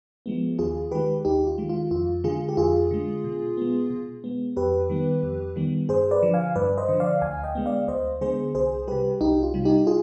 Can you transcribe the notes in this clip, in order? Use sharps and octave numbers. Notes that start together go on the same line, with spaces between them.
F3 G#3 B3
D#2 F4 G#4
D#3 G#3 G4 B4
D#2 D#4 G4
F4
D#3 G#3
F4
F2 F4
D3 G#3 F4 G#4
G4
F2 F4 G#4
D3 G#3
B2
G#3 B3
B2
G#3 B3
F2 G4 B4
D#3 G3 B3
F2
D#3 G3 B3
G2 G#4 C5
B4 D5
D3 F3
F5 G#5
G2 B4 D5
C5 D#5
D3 F3
D5 F5
D2 F5 G#5
D#5 G5
D3 G#3 B3
D5 F5
D2 C5 D#5
D3 G#3 B3 G#4 C5
C2 G#4 C5
C3 G3 G4 B4
C2 D#4 G4
F4
C3 G3
D#4 G4
F4 G#4